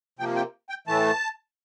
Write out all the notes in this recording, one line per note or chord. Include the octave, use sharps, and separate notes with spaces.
C3 F3 A#3 G5
G5
G5
A2 E3 A3 A5